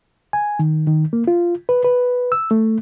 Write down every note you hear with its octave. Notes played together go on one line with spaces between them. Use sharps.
G#5
D#3
D#3
A#3
F4
B4
B4
E6
A3